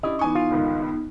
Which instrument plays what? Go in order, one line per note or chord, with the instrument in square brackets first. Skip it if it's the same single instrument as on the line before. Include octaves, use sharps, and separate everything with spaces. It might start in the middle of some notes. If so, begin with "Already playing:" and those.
[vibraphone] C#4 [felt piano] D4 E4 G4 [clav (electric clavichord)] D#5
[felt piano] E3 G#5 C#6 [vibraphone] B3 D#4
[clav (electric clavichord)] F4
[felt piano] G1 C#2 D#3